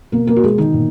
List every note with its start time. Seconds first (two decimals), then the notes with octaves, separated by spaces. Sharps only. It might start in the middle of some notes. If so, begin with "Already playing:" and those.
0.12 B2 A#3 A#4
0.27 A#3 A#4
0.36 F#4
0.43 B2 G#3 G#4
0.58 D#3 D#4
0.74 A#2